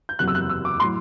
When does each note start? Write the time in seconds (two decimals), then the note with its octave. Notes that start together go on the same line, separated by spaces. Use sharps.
0.09 G6
0.19 F#1 E2 C3 F#3 F#6
0.28 E6
0.35 F#6
0.49 E6
0.65 D6
0.80 A2 F#3 C6